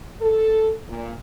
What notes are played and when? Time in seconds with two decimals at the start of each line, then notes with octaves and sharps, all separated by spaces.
0.22 A4
0.88 A#2